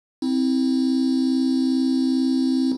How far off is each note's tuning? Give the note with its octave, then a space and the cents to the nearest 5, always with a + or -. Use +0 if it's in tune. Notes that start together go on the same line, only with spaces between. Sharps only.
C4 +0 E4 -30